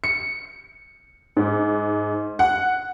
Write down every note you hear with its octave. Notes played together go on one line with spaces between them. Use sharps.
C#7
G#2
F#5